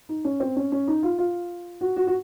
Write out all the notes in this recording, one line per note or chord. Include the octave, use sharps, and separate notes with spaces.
D#4
C#4
C4
C#4
C#4
D#4
F4
F4
F#4
F#4
F#4